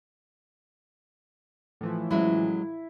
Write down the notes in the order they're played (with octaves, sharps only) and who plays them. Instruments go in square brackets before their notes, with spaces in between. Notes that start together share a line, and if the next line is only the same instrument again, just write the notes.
[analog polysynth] A2 E3 F3
[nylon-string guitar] F#3 G#3 C#4 [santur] E4